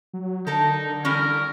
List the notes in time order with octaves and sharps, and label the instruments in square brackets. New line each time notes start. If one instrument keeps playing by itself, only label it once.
[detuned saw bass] F#3
[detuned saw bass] D3 [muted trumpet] D#4 [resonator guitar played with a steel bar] A4 A#4
[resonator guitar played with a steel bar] E3 G3 C#4 [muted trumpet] A#4